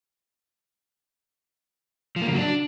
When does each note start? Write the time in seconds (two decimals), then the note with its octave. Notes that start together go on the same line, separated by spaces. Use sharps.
2.16 F3
2.22 A#3
2.27 C#3
2.33 F#3
2.38 D4